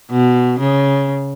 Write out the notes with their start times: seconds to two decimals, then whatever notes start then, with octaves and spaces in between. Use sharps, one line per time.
0.11 B2
0.59 C#3